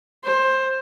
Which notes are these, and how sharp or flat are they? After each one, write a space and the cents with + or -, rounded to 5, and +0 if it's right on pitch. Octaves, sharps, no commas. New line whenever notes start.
C5 +15